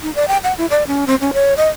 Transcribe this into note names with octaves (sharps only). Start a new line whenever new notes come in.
D#4
D5
G5
F#5
E4
D5
C#4
C4
C#4
C#5
D#5